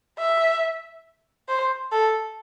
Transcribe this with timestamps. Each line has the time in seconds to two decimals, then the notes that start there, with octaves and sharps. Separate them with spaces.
0.18 E5
1.48 C5
1.92 A4